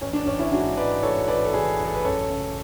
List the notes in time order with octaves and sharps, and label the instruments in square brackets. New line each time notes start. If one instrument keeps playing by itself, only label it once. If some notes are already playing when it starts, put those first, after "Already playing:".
[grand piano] A1 C#4
D4
A1 C#4
C#4 E4
G#2 D4 F#4
G#2 B4 D5
E3 A4 C#5
A1 B4 D5
A4
E3 G#4 B4
A1
A4
B4
F#2 A4 C#5
C#3